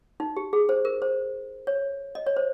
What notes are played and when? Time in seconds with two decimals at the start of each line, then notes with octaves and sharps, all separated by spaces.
0.20 D#4
0.37 G4
0.53 G#4
0.69 C5
0.85 A#4
1.02 C5
1.67 C#5
2.15 D#5
2.27 C#5
2.37 C5